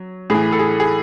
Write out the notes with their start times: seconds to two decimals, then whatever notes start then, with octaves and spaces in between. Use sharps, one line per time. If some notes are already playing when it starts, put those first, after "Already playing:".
Already playing: F#3
0.30 A2 E3 G#4
0.52 A4
0.59 G#4
0.80 G#4